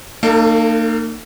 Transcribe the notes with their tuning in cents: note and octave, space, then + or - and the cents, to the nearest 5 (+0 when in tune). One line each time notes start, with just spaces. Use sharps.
A#3 -35 D#4 -40 A4 +25